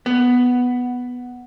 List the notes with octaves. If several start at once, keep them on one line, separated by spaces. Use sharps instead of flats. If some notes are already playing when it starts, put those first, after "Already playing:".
B3